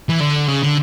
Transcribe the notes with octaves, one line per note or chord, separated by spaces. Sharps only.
E3
D3
C#3
D3